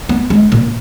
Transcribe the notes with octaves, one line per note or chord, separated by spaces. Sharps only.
B3
G#3
A#2